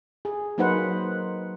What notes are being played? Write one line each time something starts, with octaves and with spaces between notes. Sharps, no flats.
G#4
F#3 A#3 D#4 B4 C5 F#5